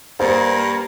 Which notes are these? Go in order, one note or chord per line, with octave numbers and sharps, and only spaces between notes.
G2 A#3 C5